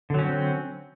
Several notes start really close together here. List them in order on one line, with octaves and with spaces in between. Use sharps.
D3 F#3 C#4 C4